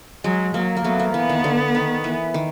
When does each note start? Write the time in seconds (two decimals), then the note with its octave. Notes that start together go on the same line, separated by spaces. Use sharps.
0.24 F#3 G#3
0.54 F#3 A#3
0.76 A#3
0.84 F#3 A3 B3
0.99 A#3
1.14 E3 B3
1.29 D#3
1.44 D3
1.75 D#3
2.04 E3
2.34 D#3